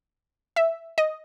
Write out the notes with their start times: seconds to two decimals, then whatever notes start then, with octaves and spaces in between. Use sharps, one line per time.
0.56 E5
0.98 D#5